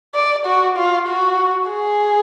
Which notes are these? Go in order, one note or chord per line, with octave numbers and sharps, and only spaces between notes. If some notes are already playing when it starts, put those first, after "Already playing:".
D5
F#4
F4
F#4
G#4